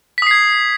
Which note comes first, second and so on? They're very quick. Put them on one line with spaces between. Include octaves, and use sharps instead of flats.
B6 D#6 C7 G#6